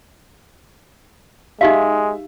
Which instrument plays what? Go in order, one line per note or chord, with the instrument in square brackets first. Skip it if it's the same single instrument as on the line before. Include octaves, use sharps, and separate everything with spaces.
[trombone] G#3 [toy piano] D#4 G4 F5 [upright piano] E5